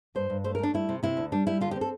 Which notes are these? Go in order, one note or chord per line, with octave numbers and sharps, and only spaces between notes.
G2 C5
G2
A3 C5
A#4
A3 D4
G3 E4
C3
C3 E4
D2
G3 D4
G3 E4
D3 F4
G4
C4
A4